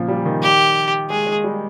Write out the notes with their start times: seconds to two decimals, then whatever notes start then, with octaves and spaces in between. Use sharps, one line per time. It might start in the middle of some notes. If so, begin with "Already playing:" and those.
Already playing: A#2 C#3 F3
0.08 G3
0.25 D#3
0.42 G4
1.10 G#3 G#4
1.27 G#3
1.44 G3